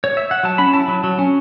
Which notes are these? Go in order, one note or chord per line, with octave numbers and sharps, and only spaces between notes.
C#5
E5
F#5
F#3 A5
C#4 B5
E4 A5
F#3
F#3
C#4